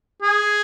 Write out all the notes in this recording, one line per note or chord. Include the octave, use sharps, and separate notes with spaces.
G#4